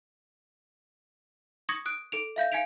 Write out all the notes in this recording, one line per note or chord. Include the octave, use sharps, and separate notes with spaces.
C#6 D#6 G#6 A#6 C#7
D#6 F#6 D7
A4 D7 F7
E5 F5 G6 A#6
F5 G#5 G#6 B6 D7 F7